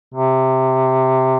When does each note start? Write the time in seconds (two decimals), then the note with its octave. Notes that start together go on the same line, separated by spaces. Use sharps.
0.14 C3